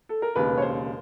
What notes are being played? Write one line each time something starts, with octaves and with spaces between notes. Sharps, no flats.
A4
A#4
E1 D#2 C#3 B4
C#5
C5